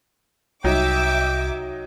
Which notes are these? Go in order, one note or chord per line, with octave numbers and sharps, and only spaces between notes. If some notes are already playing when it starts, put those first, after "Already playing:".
C2 F#3 D#4 E5 G5 D6